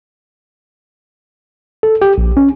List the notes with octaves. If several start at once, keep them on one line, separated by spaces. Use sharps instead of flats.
A4
G4
A#1
C#4